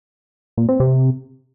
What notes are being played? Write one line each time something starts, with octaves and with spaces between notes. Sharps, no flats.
A#2
C4
C3